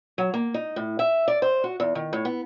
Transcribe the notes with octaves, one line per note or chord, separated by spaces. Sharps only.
F#3
A#3
D#4
A2
E5
D5
C5
F#4
E2
D#3
A2
B3